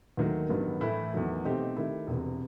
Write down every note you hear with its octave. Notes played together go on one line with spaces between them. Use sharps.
D#2 D#3 F#3 A3
A1 G2 D#3 F#3 B3
A2 E3 A3 E4 B4
E2 D#3 F#3 A3
B2 A3 C4 D#4 G4
D#3 A3 E4 G4
E1 E2 C3